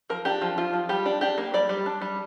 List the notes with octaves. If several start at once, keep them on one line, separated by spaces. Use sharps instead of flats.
F3 A#4
D4 G4
F3
F3 F4
F3
G3 G4
D4
D4 G4
A#3
G3 D5
G3
D4
G3